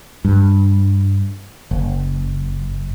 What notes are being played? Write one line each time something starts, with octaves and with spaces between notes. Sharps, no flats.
G2
F#1